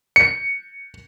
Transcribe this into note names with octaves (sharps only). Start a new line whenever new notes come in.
C#7